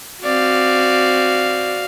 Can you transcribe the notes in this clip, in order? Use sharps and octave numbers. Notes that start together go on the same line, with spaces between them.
C4 F#4 D5 F5